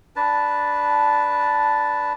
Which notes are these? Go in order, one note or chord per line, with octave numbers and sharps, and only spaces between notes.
D4 B4 A5